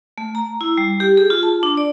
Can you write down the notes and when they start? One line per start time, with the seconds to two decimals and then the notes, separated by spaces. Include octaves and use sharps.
0.18 A3
0.35 A#5
0.61 E4
0.77 G3
1.00 G4
1.17 G#4
1.30 F4
1.43 A5
1.63 D4
1.77 D5